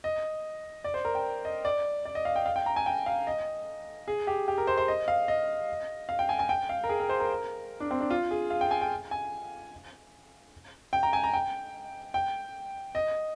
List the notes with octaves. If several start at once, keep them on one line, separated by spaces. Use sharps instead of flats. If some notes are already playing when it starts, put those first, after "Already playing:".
D#5
D5
C5
A#4
G5
D#5
D5
D5
D#5
F5
G5
F5
G5
A#5
G#5
G5
F5
D#5
G#4
G4
G4
A#4
C5
C5
D#5
F5
D#5
F5
G5
G#5
G#5
G5
F5
A#4
G#4
A#4
C5
A#4
D4
C4
D4
F4
G#4
F5
G5
G#5
G5
G#5
G5
A#5
G#5
A#5
G5
G5
D#5